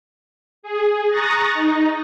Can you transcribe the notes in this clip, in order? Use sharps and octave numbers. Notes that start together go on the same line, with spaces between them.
G#4
A#5 C#6 D#6 F#6 A6 A#6
D#4